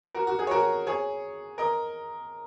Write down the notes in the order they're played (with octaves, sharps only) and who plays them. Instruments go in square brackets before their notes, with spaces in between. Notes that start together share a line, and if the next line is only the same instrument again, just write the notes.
[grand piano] F#4 A#4
F#4
G#4
C#5
F#4 A#4
G#4 C#5
A#4 D#5